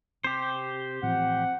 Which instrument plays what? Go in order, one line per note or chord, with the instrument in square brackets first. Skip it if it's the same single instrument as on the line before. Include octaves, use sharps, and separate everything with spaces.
[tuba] C3 [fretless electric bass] C4 [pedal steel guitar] G4 C5
[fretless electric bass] A2 E3 F3 [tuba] C4 [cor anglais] F#5